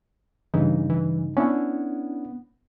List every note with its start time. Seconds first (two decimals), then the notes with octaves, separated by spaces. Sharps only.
0.54 G2 C#3 E3 D#4
0.90 E3
1.37 B3 C#4 D4 E4